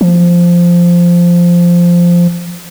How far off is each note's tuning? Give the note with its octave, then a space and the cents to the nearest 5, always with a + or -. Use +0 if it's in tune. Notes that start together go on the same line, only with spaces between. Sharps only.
F3 -5